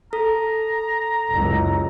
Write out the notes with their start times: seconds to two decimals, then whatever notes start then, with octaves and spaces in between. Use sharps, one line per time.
0.13 A4 A#5
1.30 F#1 C#2